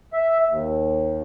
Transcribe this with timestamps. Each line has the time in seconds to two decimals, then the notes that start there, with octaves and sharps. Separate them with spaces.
0.13 E5
0.49 D#2